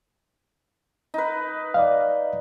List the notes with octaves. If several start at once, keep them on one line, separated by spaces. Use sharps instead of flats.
D#4 B4
D5 D#5 F5